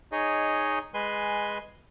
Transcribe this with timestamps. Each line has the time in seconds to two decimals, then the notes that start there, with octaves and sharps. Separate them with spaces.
0.12 D#4 G#4 C#5 D#5
0.94 G#3 B4 G#5 C6